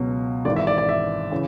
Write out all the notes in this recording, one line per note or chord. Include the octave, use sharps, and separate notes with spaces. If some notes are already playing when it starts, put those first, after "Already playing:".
Already playing: C#2 B2 F#3
G#1 G#2 E3 D5
E5
D5
D5
E5
C#3 E3